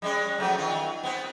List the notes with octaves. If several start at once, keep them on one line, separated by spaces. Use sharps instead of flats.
G3 G#3 C#4
F3 F#3 A3
D#3 F4
B3 C4